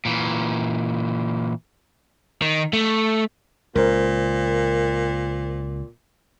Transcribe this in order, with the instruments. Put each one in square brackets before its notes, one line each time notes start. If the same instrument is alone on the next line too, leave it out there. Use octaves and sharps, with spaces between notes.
[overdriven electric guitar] A#2 E3
D#3
A3
[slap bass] C#2 [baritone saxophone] A#2 [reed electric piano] A#4 C5